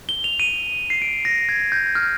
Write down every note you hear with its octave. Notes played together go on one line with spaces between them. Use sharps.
G7
F7
D#7
C7
D7
A#6
G#6
G6
F6